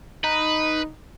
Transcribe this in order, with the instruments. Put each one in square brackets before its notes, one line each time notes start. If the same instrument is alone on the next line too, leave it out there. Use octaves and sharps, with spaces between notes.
[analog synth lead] D#4 [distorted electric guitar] B4